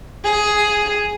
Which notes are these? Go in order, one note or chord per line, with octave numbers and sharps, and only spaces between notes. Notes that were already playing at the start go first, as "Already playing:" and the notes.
G#4